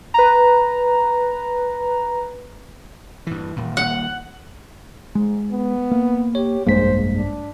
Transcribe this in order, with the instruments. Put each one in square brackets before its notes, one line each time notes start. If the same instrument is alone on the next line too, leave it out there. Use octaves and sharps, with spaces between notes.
[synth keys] B4 A#5
[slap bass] G2 E3
D#1 A#2
[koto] F#5
[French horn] G#2 [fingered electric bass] G#3
[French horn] B3
[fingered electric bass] A#3
[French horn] G4 [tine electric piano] C#5
[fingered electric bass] F1 G#3 A#3 [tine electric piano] A#1 G2 B6 [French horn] C5
[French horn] D4